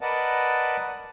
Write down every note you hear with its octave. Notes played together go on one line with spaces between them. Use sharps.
A#4 B4 D5 D#5 F#5 A5